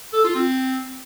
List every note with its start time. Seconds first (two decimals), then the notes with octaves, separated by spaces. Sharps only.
0.13 A4
0.24 F4
0.35 C4